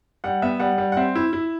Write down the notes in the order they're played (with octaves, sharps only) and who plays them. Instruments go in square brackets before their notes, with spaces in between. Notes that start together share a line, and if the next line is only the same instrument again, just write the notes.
[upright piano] G3 F#5
B3 E5
G3 F#5
G3
F#5
C4 E5
E4
E4